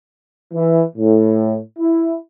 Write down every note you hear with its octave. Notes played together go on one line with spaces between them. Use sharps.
E3
A2
E4